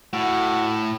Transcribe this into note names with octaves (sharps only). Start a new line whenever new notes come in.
A2 F#4